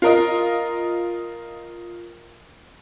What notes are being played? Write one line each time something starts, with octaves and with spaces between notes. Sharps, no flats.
F4 A#4 D#5